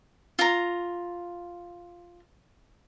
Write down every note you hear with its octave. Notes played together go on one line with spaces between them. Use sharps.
F4 A#5